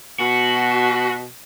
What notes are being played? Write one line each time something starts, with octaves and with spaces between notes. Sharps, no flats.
B2 F#4